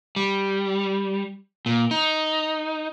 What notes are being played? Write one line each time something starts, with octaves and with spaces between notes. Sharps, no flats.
G3
A#2
D#4